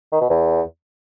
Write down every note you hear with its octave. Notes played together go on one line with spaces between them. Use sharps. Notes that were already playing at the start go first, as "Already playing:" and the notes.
D#3
B2
E2